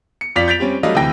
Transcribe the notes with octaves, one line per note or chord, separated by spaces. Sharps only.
C#7
F2 F4 D5 B6 F7
G6 A6 B6 D7 F7
G3 C4 C#4
F#3 G3 A3 D4 D#5 F5
D2 C3 E3 G5 A#6